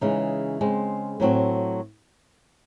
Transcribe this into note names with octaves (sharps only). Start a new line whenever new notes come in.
C#3 E3 G#3 D#4
C#3 G#3 C4
A2 F#3 C4 F#4